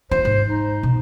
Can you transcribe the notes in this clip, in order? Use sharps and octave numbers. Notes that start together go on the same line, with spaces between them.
D1 F4 C5
G#2
D#4
B2